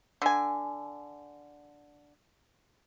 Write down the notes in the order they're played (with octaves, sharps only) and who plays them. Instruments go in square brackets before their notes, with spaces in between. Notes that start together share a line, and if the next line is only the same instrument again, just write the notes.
[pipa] D3 G#5